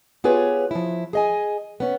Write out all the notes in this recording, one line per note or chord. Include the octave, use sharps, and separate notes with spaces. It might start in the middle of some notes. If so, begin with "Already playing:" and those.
B3 F4 G4 G#4 B4 C#5
F3 E4
G#4 D#5 G#5
B3 C#4